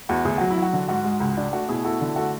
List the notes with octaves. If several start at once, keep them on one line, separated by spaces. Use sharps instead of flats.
E2 F#4
D2 G#4
F#3 F#4
E4
F#3
F#4
D3
G#2 F#4
G#3
C#2
D4
A3 F#4
B2 E4 G#4
E4 F#4 A4
D3
A3 F#4 A4